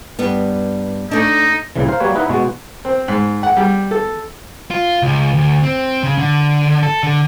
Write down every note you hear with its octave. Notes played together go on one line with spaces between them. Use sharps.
G2 G3 B3
A3 D4 D#4
C2 A#2 C#3 E3
A#4 C5 F5
F#3 G3 A#3 B4 C#5
D#4 E4 B4 D#5 E5 F#5
B2 G#3 B3 F#4
C4
G#2
F#5
G3
A4
F4
C#2
D2
C4
C#3
D3
A4
D3